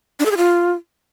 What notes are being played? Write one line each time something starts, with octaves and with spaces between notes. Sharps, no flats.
D4
A4
G#4
F4